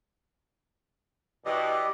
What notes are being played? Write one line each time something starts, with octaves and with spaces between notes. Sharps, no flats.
B2 E3 G4 D5 D#5